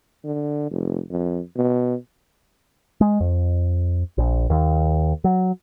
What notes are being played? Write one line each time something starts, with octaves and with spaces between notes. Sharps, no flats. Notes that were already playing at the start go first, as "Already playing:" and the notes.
D3
F1
F2
B2
G#3
F2
A#1
D#2
F#3